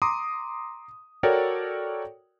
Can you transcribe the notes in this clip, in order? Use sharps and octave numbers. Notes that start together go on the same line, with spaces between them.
A#5 C6 D6 D#6
F#4 A4 A#4 C#5 D5 G5